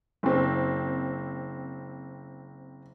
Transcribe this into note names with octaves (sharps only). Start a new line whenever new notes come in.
F#1 C4